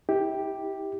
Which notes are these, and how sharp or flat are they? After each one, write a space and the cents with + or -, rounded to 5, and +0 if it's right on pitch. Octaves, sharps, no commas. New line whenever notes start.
E4 -30 G4 +0